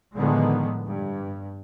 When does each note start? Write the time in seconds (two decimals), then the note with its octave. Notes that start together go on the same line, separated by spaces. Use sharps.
0.16 A2 D3 D#3 F3 G#3 B3
0.88 G2